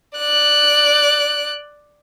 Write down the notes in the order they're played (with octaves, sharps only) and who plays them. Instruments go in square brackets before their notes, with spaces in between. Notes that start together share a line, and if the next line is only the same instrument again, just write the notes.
[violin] D5 F#6